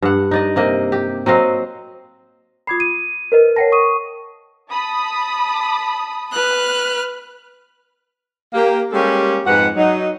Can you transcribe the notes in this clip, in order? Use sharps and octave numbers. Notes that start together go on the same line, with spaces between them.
G2 F#5
D#4 D5 D#5
C3 A#3 D#5
G4
F#3 C4 D#5 F5
F4 B5 D6 D#6 G#6 C7
D#7
A#4 B4 D#5
C#5 F#5 G5 A5 A#6
C#6 D#6 D#7
A5 B5 D#6
B4 F6 F#6
A#3 G4
G3 G#3 A#3 C#4 G4 A4
F2 G#2 G#3 B4 F#5
F#3 D#4